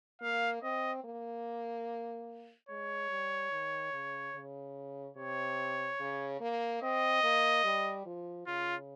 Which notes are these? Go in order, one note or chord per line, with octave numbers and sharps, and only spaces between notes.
A#3 F5
C4 D#5
A#3
G#3 C#5
G3
D#3
C#3
C#3
C3 C#5
C#3
A#3
C4 D#5
A#3
G3
F3
C#3 F4